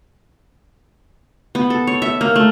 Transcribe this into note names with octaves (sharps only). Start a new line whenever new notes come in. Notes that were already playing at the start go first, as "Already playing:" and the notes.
B3
A4
C#5
E5
A#3
A3